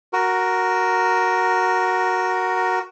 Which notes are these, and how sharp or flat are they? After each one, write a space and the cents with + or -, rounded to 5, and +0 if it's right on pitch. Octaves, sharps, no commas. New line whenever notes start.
F#4 +0 A#4 +0